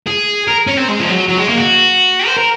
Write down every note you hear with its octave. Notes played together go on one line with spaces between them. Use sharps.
G#4
A#4
C#4
C4
G#3
F3
F#3
F#3
G#3
A#3
F#4
C5
A#4